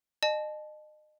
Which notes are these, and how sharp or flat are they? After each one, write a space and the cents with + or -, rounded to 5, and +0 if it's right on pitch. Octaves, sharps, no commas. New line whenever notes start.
D#5 -35 A5 -30